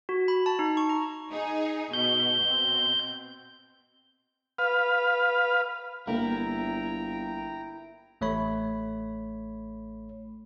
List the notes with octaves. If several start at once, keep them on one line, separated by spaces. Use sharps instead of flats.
F#4
B5
A5
D#4
C#6
A#5
D#4 G#4
B2 G6
B2 C4
B4 F5
G1 A#3 E4 G5 A#5
A1 A3 C#5 B5